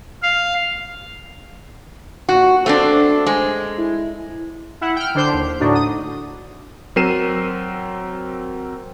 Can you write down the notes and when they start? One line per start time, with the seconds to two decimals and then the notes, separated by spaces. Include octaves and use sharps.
0.22 F5
2.29 A#2 F#4
2.66 A3 C4 D4 C5
3.26 G#3
3.78 E4
4.81 E4 F#5
4.96 G5 F6
5.15 D3 D4 C5 G6
5.33 D#2
5.60 A2 D3 D4 D#4 F#4
5.75 D#6
6.96 F#3 C4 A#4 C7 D#7 E7